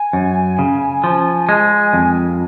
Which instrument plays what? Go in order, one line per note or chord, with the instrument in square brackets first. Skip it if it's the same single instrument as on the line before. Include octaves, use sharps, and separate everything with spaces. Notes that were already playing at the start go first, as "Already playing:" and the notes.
Already playing: [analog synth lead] G#5
[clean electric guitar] F#2
C#3
F3
G#3
F2